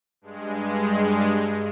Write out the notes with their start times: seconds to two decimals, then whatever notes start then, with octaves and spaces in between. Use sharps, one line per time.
0.21 G2 G#3